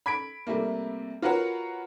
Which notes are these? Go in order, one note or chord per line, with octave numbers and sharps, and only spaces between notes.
B5 G#6 B6 D7
C3 G3 A3 A#3
F4 F#4 A#4 B4 C#5 F#5